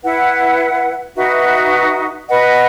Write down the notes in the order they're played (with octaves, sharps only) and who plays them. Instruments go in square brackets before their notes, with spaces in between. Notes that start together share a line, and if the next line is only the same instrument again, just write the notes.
[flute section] E4 B4 F#5
D#4 F#4 B4 E5
B4 D#5 F#5